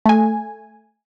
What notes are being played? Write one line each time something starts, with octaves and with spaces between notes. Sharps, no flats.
A3 G#5